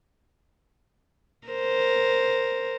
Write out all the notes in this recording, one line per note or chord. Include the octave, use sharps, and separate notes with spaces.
A#4 C5